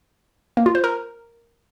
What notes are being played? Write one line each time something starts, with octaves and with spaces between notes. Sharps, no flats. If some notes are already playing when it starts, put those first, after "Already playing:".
A#3
F4
C5
A#4